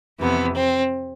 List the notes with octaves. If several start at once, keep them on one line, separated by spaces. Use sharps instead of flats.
F2 C3 E3 B3
C4